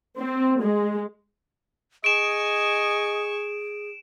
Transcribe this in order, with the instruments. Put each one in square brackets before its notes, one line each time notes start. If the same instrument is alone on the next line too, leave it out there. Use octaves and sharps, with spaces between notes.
[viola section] C4
G#3
[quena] G#4 [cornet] D#5 [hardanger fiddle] G#5 C#6 [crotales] D7 E7